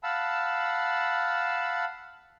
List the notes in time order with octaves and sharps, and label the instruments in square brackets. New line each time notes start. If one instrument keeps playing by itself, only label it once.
[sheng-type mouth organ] F5 F#5 A5 B5 E6